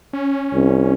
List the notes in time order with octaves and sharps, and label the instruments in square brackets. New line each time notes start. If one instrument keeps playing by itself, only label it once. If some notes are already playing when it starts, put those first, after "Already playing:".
[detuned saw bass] C#4
[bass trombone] C2